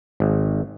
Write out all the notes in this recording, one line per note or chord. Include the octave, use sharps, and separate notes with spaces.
G#1